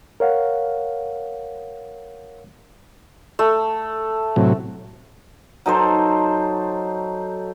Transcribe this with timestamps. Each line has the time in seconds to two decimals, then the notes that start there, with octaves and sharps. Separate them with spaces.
0.20 A#4 C#5 F5 F#5
3.39 A3
4.36 A2 C3 F#3
5.66 F#3 D#4 A4 C5